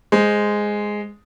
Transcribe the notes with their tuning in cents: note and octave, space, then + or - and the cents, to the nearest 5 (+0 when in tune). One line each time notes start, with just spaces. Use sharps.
G#3 +0 C5 -10